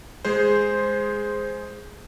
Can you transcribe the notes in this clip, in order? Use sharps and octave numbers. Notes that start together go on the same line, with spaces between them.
G#3 G#4 C5